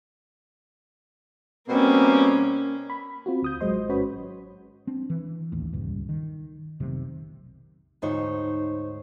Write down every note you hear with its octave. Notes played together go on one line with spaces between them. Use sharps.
B2 G3 A#3 C4 C#4
B5
C4 F4 F#4
D2 D#6 G6
A1 F#3 G#3 C5 D#5 C6
G#1 C#4 F#4 B4 C#5 B5
C4 D4
E3
A1 D#2
D#1 C#2 G2
D#3
F1 B1 C3 D#3
D2 G#2 D#4 C5 C#5